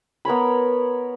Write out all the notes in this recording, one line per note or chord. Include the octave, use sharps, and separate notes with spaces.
B3 A#4 C#5 B5